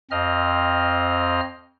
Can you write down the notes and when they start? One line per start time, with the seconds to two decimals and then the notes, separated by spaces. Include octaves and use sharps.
0.11 F2 C4 D#5 F6